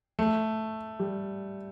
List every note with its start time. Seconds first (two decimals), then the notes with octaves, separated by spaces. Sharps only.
0.19 A3
0.99 G3